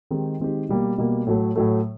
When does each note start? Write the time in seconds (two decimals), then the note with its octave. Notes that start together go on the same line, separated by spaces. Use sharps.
0.11 D#3 G#3 C4 D#4 G4
0.40 D#3 G#3 C4 D#4 G4
0.69 B2 G3 A#3
0.98 B2 G3 A#3
1.27 A2 F#3 A3
1.56 A2 F#3 A3